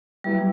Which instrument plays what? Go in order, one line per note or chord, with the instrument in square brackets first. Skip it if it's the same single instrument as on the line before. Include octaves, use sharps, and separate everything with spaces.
[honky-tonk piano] F#3 B3 E4 G4 [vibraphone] G3